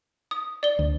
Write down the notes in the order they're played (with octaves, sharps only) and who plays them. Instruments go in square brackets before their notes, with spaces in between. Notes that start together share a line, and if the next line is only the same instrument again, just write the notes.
[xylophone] D#6
D5 G7
[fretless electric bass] D2